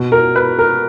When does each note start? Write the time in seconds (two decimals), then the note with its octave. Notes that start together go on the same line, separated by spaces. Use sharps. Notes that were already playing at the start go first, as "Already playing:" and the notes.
Already playing: B2
0.12 A#4
0.36 B4
0.59 A#4